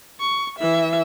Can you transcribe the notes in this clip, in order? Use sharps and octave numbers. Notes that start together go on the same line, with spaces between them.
C#6
E3 E5